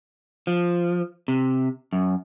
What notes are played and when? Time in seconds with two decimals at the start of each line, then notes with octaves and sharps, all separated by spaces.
0.47 F3
1.28 C3
1.93 F#2